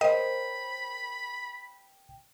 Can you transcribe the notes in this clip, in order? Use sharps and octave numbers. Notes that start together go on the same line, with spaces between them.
A#4 C5 C#5 D#5 G5 B5